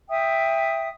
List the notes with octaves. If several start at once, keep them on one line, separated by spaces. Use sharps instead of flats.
E5 G5 D#6